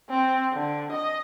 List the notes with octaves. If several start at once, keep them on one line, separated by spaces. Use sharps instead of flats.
C4
D3
D#5